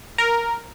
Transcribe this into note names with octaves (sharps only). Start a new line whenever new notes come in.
A#4